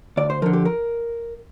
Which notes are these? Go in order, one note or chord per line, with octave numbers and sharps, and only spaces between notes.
D2 D5
C5
D3 F3 A#4
G4
A#4